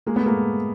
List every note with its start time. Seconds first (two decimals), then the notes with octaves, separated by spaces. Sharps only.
0.07 G#3 A#3
0.16 A3 B3
0.26 G#3 A#3